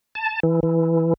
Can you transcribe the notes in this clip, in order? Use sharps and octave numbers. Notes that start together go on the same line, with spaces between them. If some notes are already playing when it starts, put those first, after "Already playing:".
A5
E3
E3